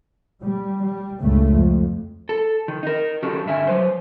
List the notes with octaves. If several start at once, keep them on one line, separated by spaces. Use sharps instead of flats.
G3
G3
C#2 G2 A3
F2
A4
D#3
D#4 A#4
D#3 F#3 C#4 F#4 G4 A4
G2 D3 E5 G#5
F#3 B4 C5